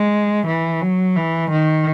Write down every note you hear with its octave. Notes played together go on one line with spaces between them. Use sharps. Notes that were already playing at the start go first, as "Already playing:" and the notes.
Already playing: G#3
E3
F#3
E3
D#3